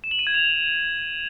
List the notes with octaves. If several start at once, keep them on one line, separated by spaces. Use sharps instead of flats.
E7
F#7
D#7
G#6
F7